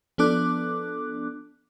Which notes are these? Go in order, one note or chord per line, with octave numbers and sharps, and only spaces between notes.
F3 B3 D4 A4 D6 F#6